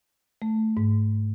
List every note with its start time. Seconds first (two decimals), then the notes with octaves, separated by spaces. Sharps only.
0.42 A3
0.77 G#2